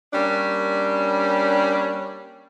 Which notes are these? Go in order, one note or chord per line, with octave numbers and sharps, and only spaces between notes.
G3 A#3 C#4 D4